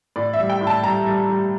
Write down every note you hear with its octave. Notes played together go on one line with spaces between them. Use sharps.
A2 D5
E5
G3
G5
A2
A5
G3 A#5
G3
G3